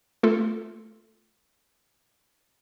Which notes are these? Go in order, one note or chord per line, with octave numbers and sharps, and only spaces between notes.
A3 F4 A4